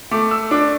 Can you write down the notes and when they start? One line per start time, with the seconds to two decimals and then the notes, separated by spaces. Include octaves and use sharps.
0.11 A3 D6
0.31 E6
0.51 D4 D6